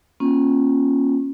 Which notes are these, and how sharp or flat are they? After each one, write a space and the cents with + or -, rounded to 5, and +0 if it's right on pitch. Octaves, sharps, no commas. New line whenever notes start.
A#3 +20 C#4 -20 F4 +0